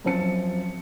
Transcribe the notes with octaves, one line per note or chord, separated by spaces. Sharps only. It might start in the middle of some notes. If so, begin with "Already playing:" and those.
F#2 F3 C4 A5 C#7